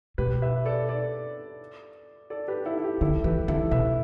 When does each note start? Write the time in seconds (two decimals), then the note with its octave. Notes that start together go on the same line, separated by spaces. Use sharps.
0.18 B2 G4 B4
0.42 B4 E5
0.66 A4 D5
0.89 A4 D5
2.30 A4 D5
2.48 G4 B4
2.65 E4 A4
2.77 E4
2.84 G4
3.01 D3 E4 A4
3.24 E3 G4 B4
3.48 D3 E4 A4
3.71 B2 B4 E5